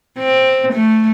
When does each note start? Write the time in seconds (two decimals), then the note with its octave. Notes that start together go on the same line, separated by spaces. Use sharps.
0.19 C4
0.74 A3